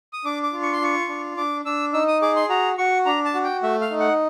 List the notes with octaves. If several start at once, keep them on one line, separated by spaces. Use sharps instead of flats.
D#6
D4 D6
D6
F4
C#6
C6
F4 C#6
D4
D4 D6
D4 E6
D#4 E6
D#6
G#4 D6
C6
F#4 A#5
F#4 C#6
D4 A#5
A5
F#4
G5
A3 E5
F5
D#4
F#5